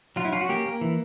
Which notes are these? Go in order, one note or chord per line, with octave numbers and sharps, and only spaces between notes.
F#3 F4
E4
C#4 F4
F#4
A#3 G4
A#3
E3